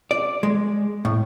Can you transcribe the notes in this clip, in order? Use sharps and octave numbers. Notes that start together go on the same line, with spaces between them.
D5
G#3
A2